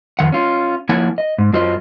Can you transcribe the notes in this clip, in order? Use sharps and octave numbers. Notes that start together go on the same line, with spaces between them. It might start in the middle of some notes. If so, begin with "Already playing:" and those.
F2 D#3 F#5
C#4 F4
F3 A#3 E4 C#5 F#5 G#5
D#5
G#2
F#2 F#3 F4 C5 D#5